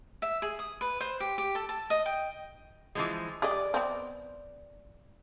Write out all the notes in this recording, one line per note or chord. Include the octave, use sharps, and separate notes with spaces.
E5
G#4
D#6
B4
C5
G4
G4
A4
A5
D#5
G5
E3 F3 G#3
G4 G#4 D5 D#5
B3 C4